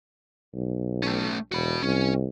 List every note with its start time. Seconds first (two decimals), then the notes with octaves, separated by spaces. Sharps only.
0.54 B1
1.03 A3 C#4
1.52 E1 F#4 B5
1.82 C2 C#4